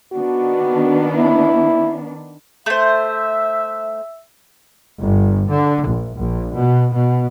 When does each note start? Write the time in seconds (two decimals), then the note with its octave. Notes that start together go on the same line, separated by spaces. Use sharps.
0.13 D#3 B3 D4 F#4
1.15 E4
2.66 A3 C5 E5
5.00 G1
5.49 D3
5.87 A#1
6.17 A#1
6.57 B2
6.93 B2